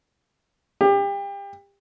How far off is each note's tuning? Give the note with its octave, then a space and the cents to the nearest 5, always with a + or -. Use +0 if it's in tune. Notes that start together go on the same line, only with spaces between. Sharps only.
G4 +30